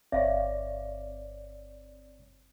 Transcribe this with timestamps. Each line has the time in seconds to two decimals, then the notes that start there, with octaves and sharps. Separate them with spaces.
0.12 G1 C4 C#5 D5 E5 F5